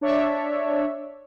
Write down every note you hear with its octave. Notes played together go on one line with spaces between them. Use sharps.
D4 C#5 D5 E5